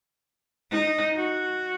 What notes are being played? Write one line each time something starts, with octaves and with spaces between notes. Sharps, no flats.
D#4
F#4